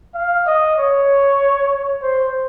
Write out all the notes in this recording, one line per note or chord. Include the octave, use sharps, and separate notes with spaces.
F5
D#5
C#5
C5